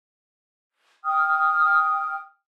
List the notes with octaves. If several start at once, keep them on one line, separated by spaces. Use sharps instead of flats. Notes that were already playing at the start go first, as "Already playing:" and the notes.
G5 D#6 F6